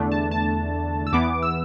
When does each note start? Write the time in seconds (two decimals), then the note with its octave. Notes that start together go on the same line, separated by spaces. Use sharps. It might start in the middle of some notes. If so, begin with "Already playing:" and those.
Already playing: E2 D3 A3 D4
0.12 A5
0.31 A5
1.07 E6
1.13 E2 E3 B3 D6
1.42 E6